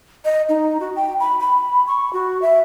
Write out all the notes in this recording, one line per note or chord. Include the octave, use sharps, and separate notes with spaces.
D#5
D#4
F#4
G5
B5
B5
C#6
F#4
E5